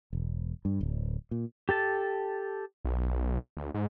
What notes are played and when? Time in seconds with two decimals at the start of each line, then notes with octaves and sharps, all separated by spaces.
0.13 E1
0.65 G2
0.81 D1
1.31 A#2
1.69 G4 A4 A5
2.85 B1
3.57 D2
3.74 G#2